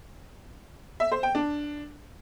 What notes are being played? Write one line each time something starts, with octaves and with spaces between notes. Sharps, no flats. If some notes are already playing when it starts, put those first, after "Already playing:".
E5
C5
G5
D4